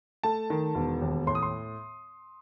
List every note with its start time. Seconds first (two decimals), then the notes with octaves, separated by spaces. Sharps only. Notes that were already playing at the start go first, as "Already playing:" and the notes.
0.23 A3 A5
0.50 D#3
0.75 E1
1.02 D#2
1.27 A2 C6
1.35 D#6
1.42 C6